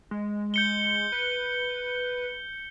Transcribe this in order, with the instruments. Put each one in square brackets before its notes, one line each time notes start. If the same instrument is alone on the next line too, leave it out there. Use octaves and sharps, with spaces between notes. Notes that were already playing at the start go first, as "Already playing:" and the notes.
[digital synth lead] G#3
[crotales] G6 C#7 G7
[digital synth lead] B4